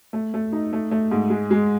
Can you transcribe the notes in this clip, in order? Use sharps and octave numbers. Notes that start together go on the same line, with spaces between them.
A3
A3
D#4
A3
A3
G#2
G#3
G#3